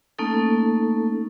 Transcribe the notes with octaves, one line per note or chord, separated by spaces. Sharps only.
A3 A#3 C#4 D#4 A4